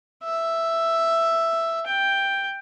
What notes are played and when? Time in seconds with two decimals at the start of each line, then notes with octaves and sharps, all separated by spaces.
0.24 E5
1.86 G5